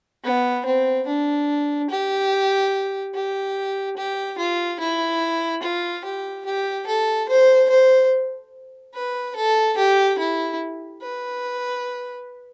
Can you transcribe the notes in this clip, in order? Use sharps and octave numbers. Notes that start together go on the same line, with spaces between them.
B3
C4
D4
G4
G4
G4
F4
E4
F4
G4
G4
A4
C5
C5
B4
A4
G4
E4
B4